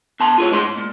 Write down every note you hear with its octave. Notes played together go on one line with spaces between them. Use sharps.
B2 A5 C6
F4 G#4 C#5
G#3 D#4 D#5 C6
G#2
A#2